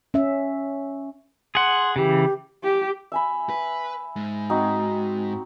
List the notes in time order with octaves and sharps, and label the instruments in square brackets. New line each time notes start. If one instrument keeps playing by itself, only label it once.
[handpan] C#4 E5
[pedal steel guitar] G#4 F#5 [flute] C6
[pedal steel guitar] C#3 E3 [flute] G4
[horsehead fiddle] G4
[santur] E5 G#5 B5
[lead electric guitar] B4
G#2
[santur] C4 D#4 F#4